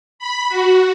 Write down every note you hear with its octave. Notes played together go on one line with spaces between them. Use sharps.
B5
F#4